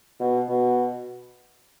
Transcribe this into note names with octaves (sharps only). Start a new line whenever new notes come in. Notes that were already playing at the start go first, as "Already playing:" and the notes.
B2
B2